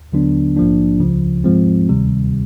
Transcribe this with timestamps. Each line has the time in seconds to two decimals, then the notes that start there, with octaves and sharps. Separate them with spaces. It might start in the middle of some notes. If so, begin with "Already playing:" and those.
0.12 D#2 D3 F#3 B3 D4
0.57 A#1 G#2 F3 A#3 D4
1.00 C#2 C#3 F3
1.44 G#2 F3 G#3 C4
1.89 D2 C3 D#3 G3